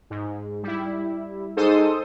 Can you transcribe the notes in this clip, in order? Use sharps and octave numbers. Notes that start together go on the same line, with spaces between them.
G#2
G3 E4
G#2 A4 C5 D#6